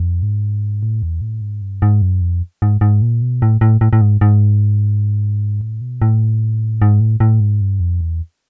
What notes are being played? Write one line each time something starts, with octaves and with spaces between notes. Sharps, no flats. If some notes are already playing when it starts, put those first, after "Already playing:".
Already playing: F2
G#2
A2
E2
A2
G#2
G2
G#2
F#2
F2
G#2
G#2
A#2
B2
A2
A2
A2
A2
G#2
G#2
A2
B2
A2
G#2
A2
A2
G#2
G2
F2
E2